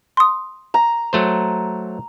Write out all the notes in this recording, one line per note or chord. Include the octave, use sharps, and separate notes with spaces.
C6 D#6
A#5
F#3 A3 C5